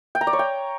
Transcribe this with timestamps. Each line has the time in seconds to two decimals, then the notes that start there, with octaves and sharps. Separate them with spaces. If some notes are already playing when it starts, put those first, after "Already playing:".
0.15 G5
0.21 A#5
0.27 D5
0.33 C#5
0.39 G5